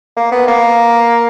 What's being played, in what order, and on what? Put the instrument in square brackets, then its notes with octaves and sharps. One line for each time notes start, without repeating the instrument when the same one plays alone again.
[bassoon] A#3
B3
A#3